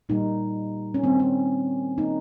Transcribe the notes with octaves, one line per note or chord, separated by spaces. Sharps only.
A#2 G3 A#3 D#4
C#4
D#3 G3 A#3 C4
C#4
D#3 A#3 D#4